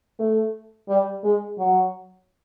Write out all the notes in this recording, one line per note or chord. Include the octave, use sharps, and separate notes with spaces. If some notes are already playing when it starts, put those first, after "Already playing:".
A3
G3
G#3
F#3